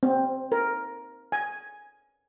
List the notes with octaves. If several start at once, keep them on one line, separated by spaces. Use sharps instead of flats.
C4
A#4
G#5